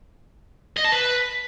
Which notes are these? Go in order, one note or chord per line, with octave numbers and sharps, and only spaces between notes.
D#5
A5
B4